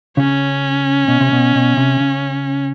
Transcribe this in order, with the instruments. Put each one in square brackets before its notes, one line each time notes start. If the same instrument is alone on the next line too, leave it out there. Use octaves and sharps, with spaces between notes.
[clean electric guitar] C#3 [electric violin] C#4
[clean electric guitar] B2
C3
B2
B2
C3
C#3